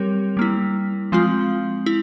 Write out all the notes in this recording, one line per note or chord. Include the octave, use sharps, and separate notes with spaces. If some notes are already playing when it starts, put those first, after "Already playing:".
Already playing: G3 C4 G4 A#4 C#5
G3 A#3 E4
F3 G#3 C4 F4
E4